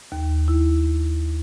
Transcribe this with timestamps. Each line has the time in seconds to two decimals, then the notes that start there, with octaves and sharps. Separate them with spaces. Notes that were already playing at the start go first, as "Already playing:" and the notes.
0.12 D#2
0.48 E4